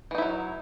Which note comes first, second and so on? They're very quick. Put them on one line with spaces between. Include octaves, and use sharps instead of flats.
E3 D#4 E4 F#3